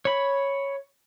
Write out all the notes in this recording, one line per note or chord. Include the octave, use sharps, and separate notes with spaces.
C#5 B5